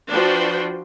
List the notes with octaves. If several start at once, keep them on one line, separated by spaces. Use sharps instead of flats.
F3 D4 F#4 B4 C5 G5